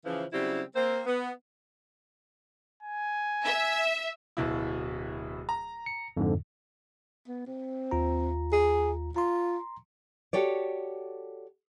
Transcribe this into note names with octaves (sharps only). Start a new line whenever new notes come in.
C#3 E3 F3
C#3 F#3 G3 C4 E4 G4
A#3 C4 C5
B3
G#5
E5
D1 B2 E4
A#5
C#7
F2 G#2 D3
B3
C4
D#2 F4 A#5
G#4
F4 A#5 C6
F#4 G4 A4 C#5 D5